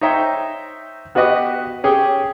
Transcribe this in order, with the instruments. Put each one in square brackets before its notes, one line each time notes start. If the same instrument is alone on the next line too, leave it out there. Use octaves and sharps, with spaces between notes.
[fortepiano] D#4 C5 C#5 E5 G5 A#5
B3 F#4 G4 B4 D#5
C#4 G4 G#4 G5